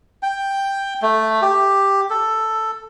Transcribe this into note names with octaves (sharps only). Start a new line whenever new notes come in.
G5
A3
G4
A4